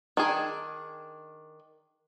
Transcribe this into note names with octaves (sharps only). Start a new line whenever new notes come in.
D#3 D4 G#4